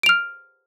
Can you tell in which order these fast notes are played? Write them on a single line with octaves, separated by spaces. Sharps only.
D7 F7 F6